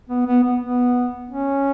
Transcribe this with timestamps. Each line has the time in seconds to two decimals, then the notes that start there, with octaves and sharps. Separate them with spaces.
0.09 B3
0.27 B3
0.43 B3
0.61 B3
1.30 C#4